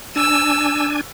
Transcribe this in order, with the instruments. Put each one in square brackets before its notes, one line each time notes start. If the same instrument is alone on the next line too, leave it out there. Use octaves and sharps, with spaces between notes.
[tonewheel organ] D4 G#5 [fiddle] E6